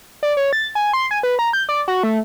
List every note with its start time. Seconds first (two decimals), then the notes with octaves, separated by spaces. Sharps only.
0.23 D5
0.37 C#5
0.53 A6
0.75 G#5
0.93 C6
1.11 G#5
1.23 B4
1.39 A#5
1.53 G6
1.69 D5
1.88 F#4
2.03 A3